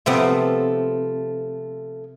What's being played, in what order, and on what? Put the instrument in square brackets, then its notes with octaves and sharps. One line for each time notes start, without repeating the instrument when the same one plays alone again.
[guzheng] C3 B3 C4 [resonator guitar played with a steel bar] F3 A3